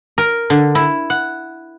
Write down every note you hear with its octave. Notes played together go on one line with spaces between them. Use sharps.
A#4
D3
E4
F#5